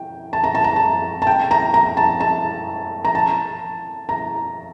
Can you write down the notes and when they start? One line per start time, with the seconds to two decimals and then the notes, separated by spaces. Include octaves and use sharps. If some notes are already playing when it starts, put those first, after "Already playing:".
Already playing: G5
0.33 A5
0.44 A#5
0.55 A5
0.64 A#5
0.76 A5
1.22 A5
1.27 G5
1.51 A#5
1.74 A#5
1.97 A5
2.20 A5
3.05 A#5
3.15 A5
4.09 A#5